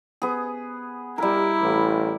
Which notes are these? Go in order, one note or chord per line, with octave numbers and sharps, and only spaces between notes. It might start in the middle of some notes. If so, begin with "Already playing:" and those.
B3 G#4
G3 E4 A#4
A1